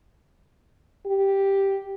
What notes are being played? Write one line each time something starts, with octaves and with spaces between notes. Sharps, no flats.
G4